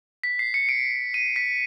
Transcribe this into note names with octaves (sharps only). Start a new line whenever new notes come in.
B6
C7
C#7
D7
D#7
B6